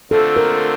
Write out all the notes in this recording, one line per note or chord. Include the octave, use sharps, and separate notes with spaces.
D3 A3 C4 F4 A4
A#4